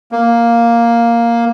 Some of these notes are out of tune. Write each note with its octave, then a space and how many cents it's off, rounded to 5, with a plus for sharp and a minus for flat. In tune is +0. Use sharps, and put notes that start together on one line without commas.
A#3 +5